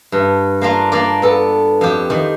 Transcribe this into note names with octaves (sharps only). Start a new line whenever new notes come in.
G2
A#3 D4 F4
A#3 D4 D5
B3 A4
F2 G4
D#3